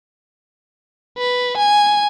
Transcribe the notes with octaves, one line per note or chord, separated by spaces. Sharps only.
B4
G#5